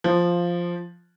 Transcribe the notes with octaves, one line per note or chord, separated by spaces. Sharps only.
F3